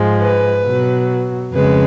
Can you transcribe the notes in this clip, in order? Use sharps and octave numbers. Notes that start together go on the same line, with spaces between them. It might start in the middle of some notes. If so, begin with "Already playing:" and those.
Already playing: G#2 F3 G#3
B4
B2 F#3
F2 C#3 G#3 B4